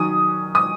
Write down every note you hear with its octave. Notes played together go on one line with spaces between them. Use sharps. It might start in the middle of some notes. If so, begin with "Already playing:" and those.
Already playing: D#3 F#3 C#4 D#6
D#6